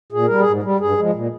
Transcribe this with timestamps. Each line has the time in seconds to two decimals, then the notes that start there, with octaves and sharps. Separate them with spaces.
0.12 A#2 G#4
0.26 G3 A#4
0.40 G#4
0.47 G#2
0.63 G3
0.80 G2 G#4
0.98 F3 G#3
1.14 A#2